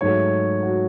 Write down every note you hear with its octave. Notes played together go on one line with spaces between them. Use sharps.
G#2 F#3 A3 C#5
F#4